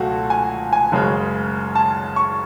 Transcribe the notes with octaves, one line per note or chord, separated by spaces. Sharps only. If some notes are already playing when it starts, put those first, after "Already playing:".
Already playing: C#2 B2 F#3 A3 F#4 A4
G#5
G#5
F#1 F#2 C#3 G#3
A5
C#6